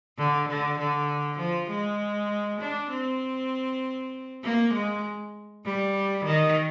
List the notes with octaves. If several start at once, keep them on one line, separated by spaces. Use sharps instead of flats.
D3
D3
D3
F3
G#3
D4
C4
A#3
G#3
G3
D#3